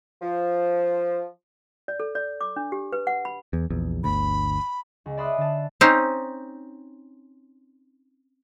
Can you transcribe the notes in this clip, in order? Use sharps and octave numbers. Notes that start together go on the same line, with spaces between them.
F3
D5
A4
D5
D6
D4
G4
B4
F#5
B5
E2
A#1 E2
G1 D2 B5
C#2
D5 E5 B5 C6 D#6 F#6
D3 A5
C4 C#4 D#4